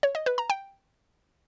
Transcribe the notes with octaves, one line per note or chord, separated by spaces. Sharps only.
C#5
D#5
B4
A#5
G5